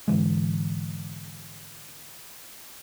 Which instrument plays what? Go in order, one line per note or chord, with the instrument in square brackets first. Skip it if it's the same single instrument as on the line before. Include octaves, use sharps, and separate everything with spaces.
[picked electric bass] G#2 D3 E3 G#3